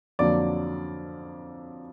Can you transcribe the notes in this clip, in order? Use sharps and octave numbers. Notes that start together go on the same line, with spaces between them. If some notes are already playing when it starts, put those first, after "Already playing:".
F2 D3 F#3 A#3 D5